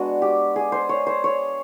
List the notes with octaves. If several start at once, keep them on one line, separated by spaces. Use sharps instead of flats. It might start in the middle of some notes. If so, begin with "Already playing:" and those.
Already playing: G#3 B3 D4 F#4
G4
G#4
C5
C#5
C5
C#5